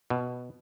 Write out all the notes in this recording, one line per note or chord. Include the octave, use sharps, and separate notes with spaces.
B2